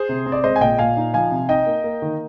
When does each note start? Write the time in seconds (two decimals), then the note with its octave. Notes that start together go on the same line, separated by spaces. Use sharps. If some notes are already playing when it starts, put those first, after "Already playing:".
Already playing: G#4 C5
0.09 C3
0.26 C4
0.32 D5
0.44 G#3 C5 D#5
0.56 G#5
0.61 A#2 D#5 G5
0.78 A#2 F5 G#5
0.97 D#4
1.14 F3 F5 G#5
1.32 C3
1.49 D#4 D#5 G5
1.66 A#3
1.84 A#3
2.02 D#3